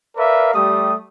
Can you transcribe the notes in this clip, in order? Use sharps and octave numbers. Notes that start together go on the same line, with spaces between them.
A#4 B4 D5 E5 F5
G3 A3 G4 D#6